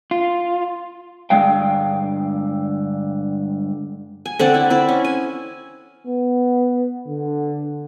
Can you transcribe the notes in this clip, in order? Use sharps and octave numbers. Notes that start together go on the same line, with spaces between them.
F4
G2 D3 G#3 F5 G5
G#5
D3 C4 D5 F#5
E4
C4 E4 D5
C#4
G#5
B3
D3